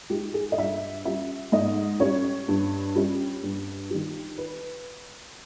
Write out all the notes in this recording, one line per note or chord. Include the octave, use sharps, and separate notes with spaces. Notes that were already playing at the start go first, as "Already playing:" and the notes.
G#3 D#4 G4
G#4
D#5
G2 E5
G3 C#4 E5
G#2 D#5
G3 C#4 C#5
G2
G3 C#4
G2
D#3 G3
B4